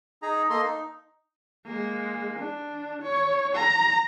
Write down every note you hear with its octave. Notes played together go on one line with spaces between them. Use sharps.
D#4 G#4 A#5
A#3 A4 D#5 C6
D#4
G#3 A#3
D4
C#5
A#5